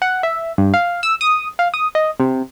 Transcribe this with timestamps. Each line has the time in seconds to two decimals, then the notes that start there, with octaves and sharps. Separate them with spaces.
0.02 F#5
0.23 E5
0.58 G2
0.74 F5
1.03 E6
1.21 D#6
1.59 F5
1.74 D#6
1.95 D#5
2.20 C3